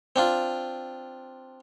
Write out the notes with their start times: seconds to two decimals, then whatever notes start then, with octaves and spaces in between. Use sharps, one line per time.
0.16 C4 D4 F4